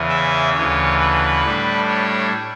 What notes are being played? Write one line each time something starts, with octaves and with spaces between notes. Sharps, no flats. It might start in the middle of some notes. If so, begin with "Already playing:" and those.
Already playing: E2 C#3 E3
E5
D2 C#3 E3 C#5
B4
A2 G3 D4
C#5